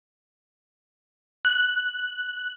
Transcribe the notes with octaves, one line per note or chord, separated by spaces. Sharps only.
F#6